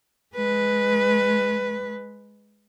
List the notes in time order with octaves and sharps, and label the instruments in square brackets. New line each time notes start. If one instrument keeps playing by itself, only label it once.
[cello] G#3 B4